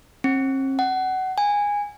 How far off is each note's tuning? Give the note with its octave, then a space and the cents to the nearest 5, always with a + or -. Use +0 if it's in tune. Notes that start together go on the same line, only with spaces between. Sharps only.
C4 +45
F#5 +25
G#5 -15